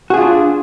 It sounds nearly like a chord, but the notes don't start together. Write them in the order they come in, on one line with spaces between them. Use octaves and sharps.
F#4 G#4 F4 D4